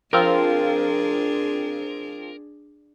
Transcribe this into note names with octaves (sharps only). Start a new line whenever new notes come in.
F3 C4 D4 F4 G#4 A#4